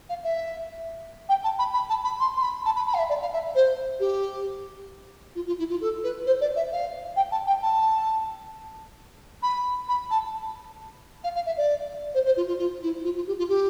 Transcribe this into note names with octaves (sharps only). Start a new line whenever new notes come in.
F5
E5
G5
A5
B5
B5
A5
B5
C6
C6
B5
A5
B5
B5
F5
E5
D5
F5
E5
C5
G4
F4
F4
E4
F4
A4
B4
C5
D5
E5
F5
G5
A5
G5
A5
B5
B5
A5
F5
F5
E5
D5
C5
C5
F4
F4
F4
E4
F4
F4
G4
F4
G4